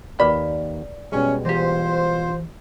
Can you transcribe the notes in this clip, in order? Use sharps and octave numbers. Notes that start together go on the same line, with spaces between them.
D#2 D#3 A#3 B4 D5 B5
B2 G3 G#3 C#4
E3 F4 G4 C5